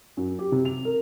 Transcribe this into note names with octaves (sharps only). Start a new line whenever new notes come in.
F#2
G4
C3
F7
A#4